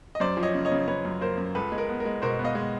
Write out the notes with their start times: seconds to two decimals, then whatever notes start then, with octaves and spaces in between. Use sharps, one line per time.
0.15 D#5
0.20 F#2 C5 D5
0.37 F3
0.43 C#5 D#5
0.55 C#3
0.65 C#5 D#5
0.71 C#3
0.88 C#3 B4 C#5
1.05 F#2
1.21 A#3 A#4 C5
1.38 F#2
1.55 C#2 A4 B4
1.72 G#3
1.78 A#4
1.89 B3
2.00 A#4
2.05 G#3
2.22 B2 A#4 C5
2.39 B3
2.44 D#5 F5
2.55 G#3